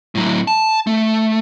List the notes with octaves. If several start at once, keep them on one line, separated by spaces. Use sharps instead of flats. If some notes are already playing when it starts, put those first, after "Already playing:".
A2 F#3
A5
A3